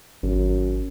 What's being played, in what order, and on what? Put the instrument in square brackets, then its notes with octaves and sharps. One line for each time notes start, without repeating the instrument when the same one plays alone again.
[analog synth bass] G#1 [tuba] F#2